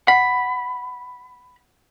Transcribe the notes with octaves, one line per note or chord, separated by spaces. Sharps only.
F#5 B5